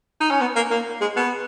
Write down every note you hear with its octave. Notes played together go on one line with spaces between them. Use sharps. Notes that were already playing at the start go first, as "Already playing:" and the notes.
D#4
C#4
B3
A#3
A#3
G#3
B3